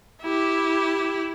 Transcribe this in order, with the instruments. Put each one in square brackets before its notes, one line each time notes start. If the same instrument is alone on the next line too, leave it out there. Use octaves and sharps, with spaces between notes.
[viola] E4 G4